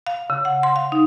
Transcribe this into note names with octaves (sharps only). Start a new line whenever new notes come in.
F5
C#3
F#5
C6
F5
D#4